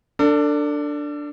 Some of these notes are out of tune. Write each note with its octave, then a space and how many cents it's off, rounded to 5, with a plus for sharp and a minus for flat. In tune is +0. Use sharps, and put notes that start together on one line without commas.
D4 +0 A4 +35